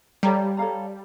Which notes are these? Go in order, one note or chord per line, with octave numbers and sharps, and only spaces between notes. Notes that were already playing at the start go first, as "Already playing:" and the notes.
G3 A4 C#5 F5 A#5
A4 C#5 F5 A#5